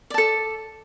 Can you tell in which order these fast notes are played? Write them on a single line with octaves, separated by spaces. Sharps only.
D5 A5 A4